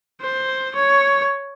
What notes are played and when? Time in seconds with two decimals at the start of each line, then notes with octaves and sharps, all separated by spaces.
0.21 C5
0.75 C#5